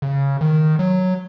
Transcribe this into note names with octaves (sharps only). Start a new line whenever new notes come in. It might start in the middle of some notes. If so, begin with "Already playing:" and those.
C#3
D#3
F#3